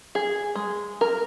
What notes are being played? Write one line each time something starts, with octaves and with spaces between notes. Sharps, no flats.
G#4
G#3
A#4